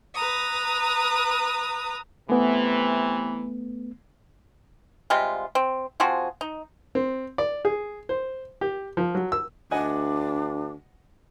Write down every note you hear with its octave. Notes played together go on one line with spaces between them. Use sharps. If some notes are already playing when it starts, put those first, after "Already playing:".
B4 A#5 D#6
C3 E3 A3 B3
C3 G3 G#3 F4
C4
F3 C4 F#4 G#4
D#4
C4
D5
G#4
C5
G4
F3
F#3
E6
D2 D4 D#5 F#5 G#5